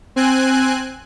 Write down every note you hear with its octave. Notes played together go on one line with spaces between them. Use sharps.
C4 G#5 F#6